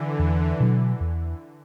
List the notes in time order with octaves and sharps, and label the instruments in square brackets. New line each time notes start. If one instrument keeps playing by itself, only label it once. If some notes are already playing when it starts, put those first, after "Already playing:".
Already playing: [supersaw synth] D3 E3
[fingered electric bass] E2
B2 F#3
E2